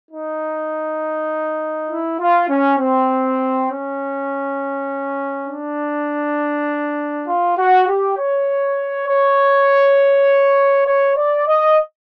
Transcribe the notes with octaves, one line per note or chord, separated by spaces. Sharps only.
D#4
E4
F4
C#4
C4
C#4
D4
F4
F#4
G4
C#5
C#5
C#5
D5
D#5